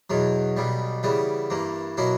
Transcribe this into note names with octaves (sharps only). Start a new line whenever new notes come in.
E2 B2 F#3
B1 B2 G3
C#3 E3 G3 B3
G2 E3 A#3
B2 F#3 A#3 E4